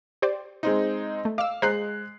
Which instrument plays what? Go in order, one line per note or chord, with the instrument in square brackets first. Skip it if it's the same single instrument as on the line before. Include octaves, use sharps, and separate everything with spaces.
[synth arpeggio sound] G4 C5 D5
[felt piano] G#3 C4 D#4
[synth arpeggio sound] A3
[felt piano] F5 [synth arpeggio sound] D6 E6
[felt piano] G#3 F#6 C7 [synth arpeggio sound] C5 D#5 A#5